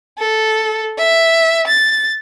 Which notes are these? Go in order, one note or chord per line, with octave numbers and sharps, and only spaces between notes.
A4
E5
A6